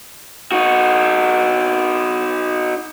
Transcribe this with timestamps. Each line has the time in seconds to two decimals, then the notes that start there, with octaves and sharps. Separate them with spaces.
0.52 D#4 F#4